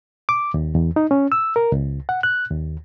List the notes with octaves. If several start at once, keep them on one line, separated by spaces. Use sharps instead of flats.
D6
D#2
E2
D#4
C#4
E6
A#4
C#2
F#5
F#6
D#2